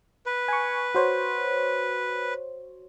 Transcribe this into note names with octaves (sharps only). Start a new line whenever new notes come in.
B4
G#5 C#6
F#4 C5 C#5